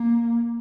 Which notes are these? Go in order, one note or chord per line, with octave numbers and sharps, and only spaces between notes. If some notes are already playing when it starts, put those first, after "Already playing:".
Already playing: A#3